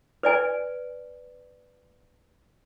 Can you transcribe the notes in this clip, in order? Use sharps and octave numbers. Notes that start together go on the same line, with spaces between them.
B4 D5 G#5